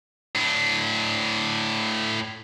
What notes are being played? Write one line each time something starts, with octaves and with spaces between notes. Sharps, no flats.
A2 D4